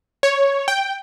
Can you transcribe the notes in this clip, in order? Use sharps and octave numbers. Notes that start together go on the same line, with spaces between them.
C#5
G5